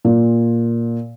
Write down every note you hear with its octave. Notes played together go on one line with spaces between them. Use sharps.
A#2